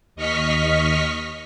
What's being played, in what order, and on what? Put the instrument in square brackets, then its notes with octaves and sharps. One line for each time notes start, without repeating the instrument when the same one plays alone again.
[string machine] D#2 D#5 C#6 F6 B6